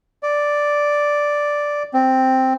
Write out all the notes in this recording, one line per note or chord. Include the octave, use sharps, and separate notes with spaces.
D5
C4